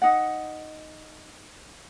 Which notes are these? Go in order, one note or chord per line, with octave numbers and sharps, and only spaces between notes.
D#4 F#5